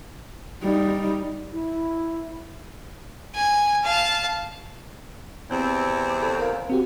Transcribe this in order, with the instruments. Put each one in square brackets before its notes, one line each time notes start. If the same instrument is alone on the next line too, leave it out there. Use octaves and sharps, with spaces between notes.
[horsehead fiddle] G3 D#4
[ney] E4
[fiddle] G#5
F5 A5
[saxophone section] E2 C3 C4 [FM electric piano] G6
[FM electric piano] D6
A4
A#4 F5
C4 F#4 G4